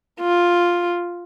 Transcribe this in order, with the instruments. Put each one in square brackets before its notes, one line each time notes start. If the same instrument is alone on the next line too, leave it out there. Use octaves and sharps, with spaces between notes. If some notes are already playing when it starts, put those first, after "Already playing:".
[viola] F4